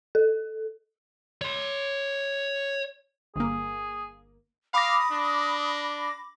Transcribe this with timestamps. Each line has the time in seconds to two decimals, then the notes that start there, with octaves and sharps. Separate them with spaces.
0.15 A4
1.41 C#5 C6
3.36 G1 A#3 G#4
4.74 F5 B5 D6 D#6 A#6
5.12 D4